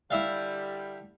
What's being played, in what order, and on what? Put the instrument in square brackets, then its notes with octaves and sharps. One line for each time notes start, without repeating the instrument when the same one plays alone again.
[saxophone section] D3 G3 [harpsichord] E4 E5 F5